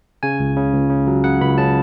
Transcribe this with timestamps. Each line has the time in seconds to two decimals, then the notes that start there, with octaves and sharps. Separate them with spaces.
0.23 C#3 G#5
0.40 C#2
0.57 C#3
0.73 C#2
0.90 C#3
1.07 F#3
1.24 C#3 F#5
1.41 C#2 B5
1.58 C#3 A5